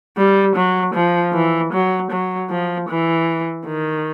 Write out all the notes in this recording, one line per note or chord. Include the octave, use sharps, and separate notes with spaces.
G3
F#3
F3
E3
F#3
F#3
F3
E3
D#3